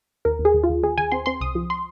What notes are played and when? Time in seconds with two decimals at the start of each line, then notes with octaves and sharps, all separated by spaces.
0.25 D#2 A#4
0.39 D#2
0.45 G#4
0.54 D#2
0.63 F4
0.69 D#2
0.83 D#2 G#4
0.98 D#2 G#5
1.12 C4 C6
1.26 C4 C6
1.41 C2 D#6
1.55 F3
1.70 C6